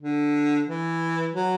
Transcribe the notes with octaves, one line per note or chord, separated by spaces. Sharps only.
D3
E3
F#3